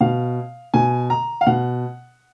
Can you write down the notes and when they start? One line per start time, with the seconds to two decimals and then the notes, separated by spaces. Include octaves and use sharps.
0.01 B2 F5
0.74 B2 G#5
1.10 A#5
1.41 F5
1.47 B2 F#5